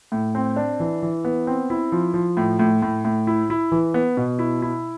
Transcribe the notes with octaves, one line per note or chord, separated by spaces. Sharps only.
A2
C4
D4
E3
E3
B3
C4
E4
F3
F3
A2
A2
A2
A2
E4
E4
E3
B3
B2
E4
E4